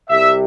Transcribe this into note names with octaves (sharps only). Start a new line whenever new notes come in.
C2 C3 G3 E5